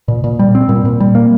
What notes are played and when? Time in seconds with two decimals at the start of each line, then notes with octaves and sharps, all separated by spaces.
0.08 A#2
0.24 A#2
0.39 G3
0.55 C4
0.69 A#2
0.85 A#2
1.00 G3
1.15 A#3